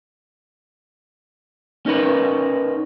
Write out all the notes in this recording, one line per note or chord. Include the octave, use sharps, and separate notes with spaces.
C#4 D#4 A#4 B4